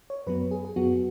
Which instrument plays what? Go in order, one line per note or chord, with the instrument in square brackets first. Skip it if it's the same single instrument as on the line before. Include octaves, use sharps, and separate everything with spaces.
[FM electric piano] C#5
F#2 F#3 B3 B4
G#4
G#4
F#2 F#3 B3 F#4